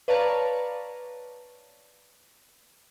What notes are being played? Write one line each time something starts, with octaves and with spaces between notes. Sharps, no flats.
B4 C#5 D5 F5 A5 A#5